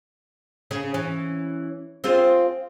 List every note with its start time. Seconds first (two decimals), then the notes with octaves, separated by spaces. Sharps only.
0.71 C#3 C#4 G#4
0.94 E3 C#4
2.04 C4 F4 G#4